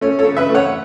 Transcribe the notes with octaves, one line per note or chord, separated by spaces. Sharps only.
A3 C#4
A4 C#5
C#3
B4 E5
A3
C#5 F#5